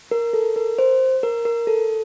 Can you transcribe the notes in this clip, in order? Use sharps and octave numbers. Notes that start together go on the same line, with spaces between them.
A#4
A4
A#4
C5
A#4
A#4
A4